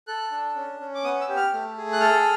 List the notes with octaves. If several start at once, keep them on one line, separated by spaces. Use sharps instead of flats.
A4 F#6
D4
C#4
C#4
D6
B3 D#6
E6
G4
F6
A3
G#4
F#6
A4 F6